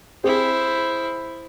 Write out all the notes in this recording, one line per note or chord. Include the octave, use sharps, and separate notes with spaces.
C4 E4 G#4 C5